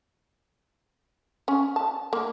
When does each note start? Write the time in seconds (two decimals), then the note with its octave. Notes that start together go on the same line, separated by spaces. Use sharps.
1.48 C#4
1.76 A5
2.13 A#3